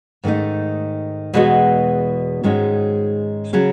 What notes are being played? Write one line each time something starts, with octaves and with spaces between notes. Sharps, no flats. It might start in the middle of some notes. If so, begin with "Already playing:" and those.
G#2 D#3 A3 D#4
E2 B2 G#3 B3 F#4
G#2 D#3 G#3 C#4 F#4
C#3 F#3 C#4 G#4